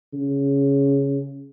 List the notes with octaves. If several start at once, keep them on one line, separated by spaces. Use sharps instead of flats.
C#3